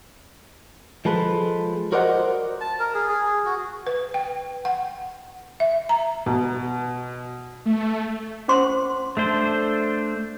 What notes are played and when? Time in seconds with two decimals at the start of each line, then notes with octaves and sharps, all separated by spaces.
1.05 F3 G#3 A4 B4
1.92 F#4 A#4 C5 D5 D#5 F#5
2.61 A5
2.80 A#4
2.94 G#4
3.09 G#4
3.46 F#4
3.87 B4
4.14 G5
4.65 F#5
5.60 E5
5.89 A#5
6.26 B2
7.66 A3
8.48 C#4 C5 C6
9.17 A3 D4 C5